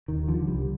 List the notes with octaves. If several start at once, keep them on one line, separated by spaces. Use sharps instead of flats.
D#2 D#3
D3 F3
C2 G3